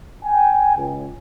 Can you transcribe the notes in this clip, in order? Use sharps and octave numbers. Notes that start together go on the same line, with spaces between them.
G5 G#5
C#2